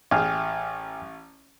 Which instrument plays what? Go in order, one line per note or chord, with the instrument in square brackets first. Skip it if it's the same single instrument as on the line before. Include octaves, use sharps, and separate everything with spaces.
[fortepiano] A1 G#4 [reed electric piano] G5 G#5 F6